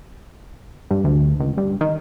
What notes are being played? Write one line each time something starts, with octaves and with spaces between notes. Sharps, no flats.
G2
D2
C#2
G2
D#3